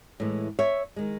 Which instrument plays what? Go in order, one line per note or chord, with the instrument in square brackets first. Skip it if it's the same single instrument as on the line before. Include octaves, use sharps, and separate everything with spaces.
[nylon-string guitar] A2 E3 G#3
C#5 E5
D#3 G#3